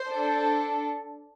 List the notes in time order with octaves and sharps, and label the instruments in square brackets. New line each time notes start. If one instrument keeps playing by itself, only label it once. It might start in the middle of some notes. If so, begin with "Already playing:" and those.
Already playing: [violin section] C5
D4 A4